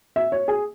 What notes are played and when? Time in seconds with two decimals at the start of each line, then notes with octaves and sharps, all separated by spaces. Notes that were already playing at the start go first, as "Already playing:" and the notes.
0.16 E5
0.32 C#5
0.48 G#4